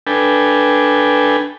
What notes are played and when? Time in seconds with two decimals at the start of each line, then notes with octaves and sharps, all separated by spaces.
0.07 D4 A4 B4 G5 G#5